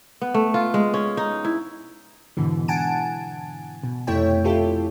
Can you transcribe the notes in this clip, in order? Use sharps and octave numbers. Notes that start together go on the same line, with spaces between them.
B3
A3
F4
G#3
C#4
D#4
E4
G#2 B2 D3 E3
F#5 G#5 A5 D7
B2
F2 C3 A3 E4 C#5 G5
E4 F4 G4 A4